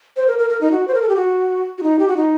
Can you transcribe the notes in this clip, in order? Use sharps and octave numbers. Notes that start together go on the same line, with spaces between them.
C5
A#4
A#4
A#4
D#4
F#4
C5
A#4
A4
G4
F#4
F#4
D#4
G4
F#4
D#4